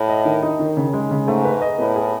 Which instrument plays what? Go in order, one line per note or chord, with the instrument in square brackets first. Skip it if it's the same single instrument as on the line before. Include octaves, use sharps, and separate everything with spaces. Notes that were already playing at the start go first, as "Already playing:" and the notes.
Already playing: [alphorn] A2
[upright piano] D#5
D#3
D#4
D#3
C#3
G#3
C#3
[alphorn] G#2 [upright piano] A3
[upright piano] B4
D#5
[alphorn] A2 [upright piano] B3
[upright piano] G#4